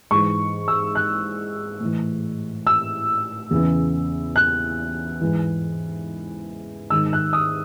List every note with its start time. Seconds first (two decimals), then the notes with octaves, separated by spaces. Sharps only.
0.11 G#2 E3 C#6
0.68 E6
0.95 F#6
1.80 A2 E3
2.67 E6
3.51 E2 C#3 E3
4.36 F#6
5.21 G#2 E3
6.90 G#2 D#3 E6
7.13 F#6
7.33 D#6